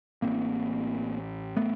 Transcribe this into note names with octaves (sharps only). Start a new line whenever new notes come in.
A1 A2 A#3 C4
A3 B3